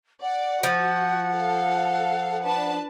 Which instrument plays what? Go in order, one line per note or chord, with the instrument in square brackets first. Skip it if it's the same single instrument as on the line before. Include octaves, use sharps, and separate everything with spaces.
[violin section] D5 [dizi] F#5
[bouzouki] F3 [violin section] F#4
[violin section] A4 F5
D4 B4 A5